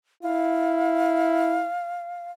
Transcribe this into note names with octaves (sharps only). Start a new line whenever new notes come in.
E4 F5